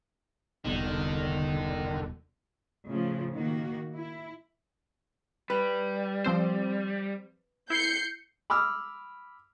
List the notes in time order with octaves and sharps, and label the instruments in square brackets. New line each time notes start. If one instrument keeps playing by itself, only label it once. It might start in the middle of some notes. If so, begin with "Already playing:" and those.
[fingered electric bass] E1 C2 B2 [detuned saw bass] D3 [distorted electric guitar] D#3
[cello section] A2 C#3 F3 A3
D#3 A#3 F#4
E4
[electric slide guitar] G3 [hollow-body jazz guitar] B4
[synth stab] F3 C4 C5
[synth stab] E4 [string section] G6 C7 C#7
[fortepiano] B5 D6 E6 F6